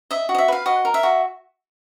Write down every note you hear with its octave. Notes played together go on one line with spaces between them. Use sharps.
D#5 E5
F#4
D#5
E5
B4 F5
F#4 D#5
A#4
E5
F#4